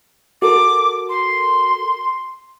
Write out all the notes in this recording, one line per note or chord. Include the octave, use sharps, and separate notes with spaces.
F#4 A4 A#4 D6
C6